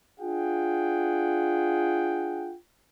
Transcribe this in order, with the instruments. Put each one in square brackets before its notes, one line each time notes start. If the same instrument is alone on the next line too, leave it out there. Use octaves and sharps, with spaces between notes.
[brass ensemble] D4 F4 G#4 F#5 G5